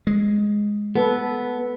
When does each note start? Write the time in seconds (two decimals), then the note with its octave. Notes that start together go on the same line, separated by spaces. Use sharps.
0.07 G#3
0.95 B3 A4 B4